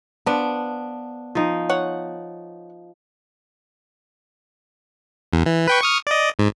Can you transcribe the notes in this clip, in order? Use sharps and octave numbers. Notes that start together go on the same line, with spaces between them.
F3 B3 D4
F3 D#4
C#5 F#5
E2
E3
B4 G5 C#6
C#6 D#6 F6
D5 D#5
G#2